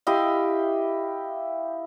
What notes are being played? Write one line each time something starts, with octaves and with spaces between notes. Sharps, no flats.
E4 G4 D#5 F5